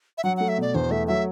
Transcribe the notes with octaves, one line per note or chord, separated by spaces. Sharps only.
E5
F#3 F#5
A3 F#5
E5
B2 D5
E2 C5
A3 E5
F#3 E5